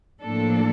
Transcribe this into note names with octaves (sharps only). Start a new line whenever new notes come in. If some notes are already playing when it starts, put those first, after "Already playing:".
A2 F3 A#3 D4 A4